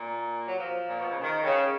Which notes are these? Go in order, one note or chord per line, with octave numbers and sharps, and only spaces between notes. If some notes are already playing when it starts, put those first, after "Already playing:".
Already playing: A#2
F#3
F3
A#2
B2
C#3
D#3
C#3